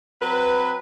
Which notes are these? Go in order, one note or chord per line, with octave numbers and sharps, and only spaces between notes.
F#3 C4 B4